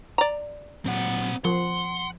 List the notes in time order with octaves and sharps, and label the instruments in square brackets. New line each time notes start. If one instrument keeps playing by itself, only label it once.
[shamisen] D5 A#5
[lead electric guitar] A#2 F#3 [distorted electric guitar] C4 F#5
[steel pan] F3 [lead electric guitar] F#5 [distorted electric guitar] C6